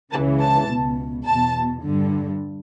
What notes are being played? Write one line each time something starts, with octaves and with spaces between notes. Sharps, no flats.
C#2 C#3 E3 A5
A5
C#2 B2
E2 B2 A5
G2 D3